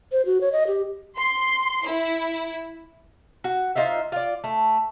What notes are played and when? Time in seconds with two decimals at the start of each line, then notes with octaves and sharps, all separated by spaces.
0.12 C5
0.26 F#4
0.41 C#5
0.52 D#5
0.67 G4
1.17 C6
1.88 E4
3.44 F#4
3.76 D#4 F4 C5 E5
4.12 F4 D5
4.44 A3